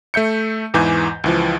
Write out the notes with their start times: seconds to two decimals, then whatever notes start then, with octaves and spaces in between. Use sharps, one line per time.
0.14 A3 E5 G6 C#7
0.74 E2 G#2 E3 G#5 D6 G6
1.24 C#2 E3 F3